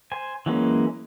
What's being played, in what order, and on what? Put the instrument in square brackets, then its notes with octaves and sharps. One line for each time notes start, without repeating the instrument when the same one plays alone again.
[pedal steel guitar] C5 G#5
E3 F#3 G#3 A#3 C#4